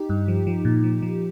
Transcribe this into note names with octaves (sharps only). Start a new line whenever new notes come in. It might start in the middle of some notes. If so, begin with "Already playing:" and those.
Already playing: D#4 G4
G2
F3
F3
A#2
F3
F3